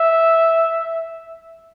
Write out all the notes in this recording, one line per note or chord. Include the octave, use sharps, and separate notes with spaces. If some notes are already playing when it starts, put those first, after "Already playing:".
Already playing: E5